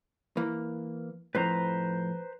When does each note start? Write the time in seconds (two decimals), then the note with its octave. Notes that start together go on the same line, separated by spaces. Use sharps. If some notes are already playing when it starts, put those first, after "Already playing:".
0.37 E3 A#3
1.35 F2 A2 B4 C5 A#5